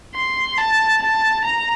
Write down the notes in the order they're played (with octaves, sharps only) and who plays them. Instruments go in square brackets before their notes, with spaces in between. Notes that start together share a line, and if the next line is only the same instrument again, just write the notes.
[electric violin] C6
A5
A5
A#5